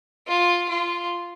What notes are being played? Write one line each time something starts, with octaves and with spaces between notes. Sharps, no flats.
F4
F4